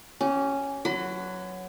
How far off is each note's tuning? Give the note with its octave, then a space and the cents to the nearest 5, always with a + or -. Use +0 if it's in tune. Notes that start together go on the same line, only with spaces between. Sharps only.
C#4 +0 G4 -30
F#3 +0 B4 +0 B5 +45